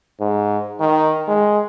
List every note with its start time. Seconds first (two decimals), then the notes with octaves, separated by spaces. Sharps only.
0.20 G#2
0.80 D#3
1.28 G#3